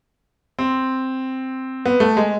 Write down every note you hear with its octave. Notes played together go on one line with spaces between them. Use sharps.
C4
B3
A3
G#3